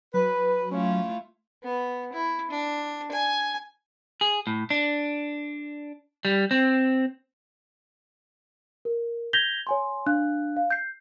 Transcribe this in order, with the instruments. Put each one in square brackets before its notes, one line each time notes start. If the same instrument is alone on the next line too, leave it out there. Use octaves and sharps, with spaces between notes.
[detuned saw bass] F#3 [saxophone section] B4
[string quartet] A3 E4 F4 [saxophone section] C#4
[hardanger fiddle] B3
E4
D4
G#5
[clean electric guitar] G#4
A2
D4
G3
C4
[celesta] A#4
G6 G#6 A#6 B6 F7 G7
C#5 G#5 C6
D4 F5 F#6
F5
G6 C7